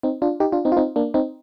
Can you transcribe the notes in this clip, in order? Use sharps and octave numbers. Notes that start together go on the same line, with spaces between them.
C4 D#4
D4 F4
D#4 G4
D4 F4
C4 D#4
F4
C4 D#4
A#3 D4
C4 D#4